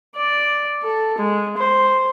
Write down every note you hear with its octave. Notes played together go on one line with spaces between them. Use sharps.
D5
A4
G#3
C5